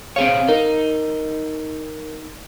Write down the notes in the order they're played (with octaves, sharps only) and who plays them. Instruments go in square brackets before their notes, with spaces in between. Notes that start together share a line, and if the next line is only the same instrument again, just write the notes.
[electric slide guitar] C4 G#4 C#5 [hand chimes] F5
[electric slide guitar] D#4 [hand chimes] A#4